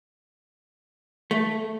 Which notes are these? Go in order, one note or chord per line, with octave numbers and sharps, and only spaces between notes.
A3